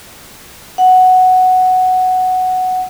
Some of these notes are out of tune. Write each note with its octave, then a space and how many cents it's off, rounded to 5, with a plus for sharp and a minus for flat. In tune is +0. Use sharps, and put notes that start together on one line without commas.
F#5 +0